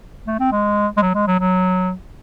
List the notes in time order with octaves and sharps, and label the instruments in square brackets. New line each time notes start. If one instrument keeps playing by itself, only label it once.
[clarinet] A3
C4
G#3
G#3
F#3
G#3
F#3
F#3